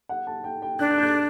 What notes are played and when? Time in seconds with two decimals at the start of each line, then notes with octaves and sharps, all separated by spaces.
0.09 F#5
0.27 A5
0.44 G5
0.62 G5
0.79 D4 F#6
0.91 F#6
0.98 G6
1.03 F#6